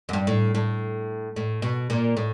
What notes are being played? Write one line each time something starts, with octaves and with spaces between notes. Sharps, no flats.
F#2
G2
A2
A2
A2
B2
A#2
A2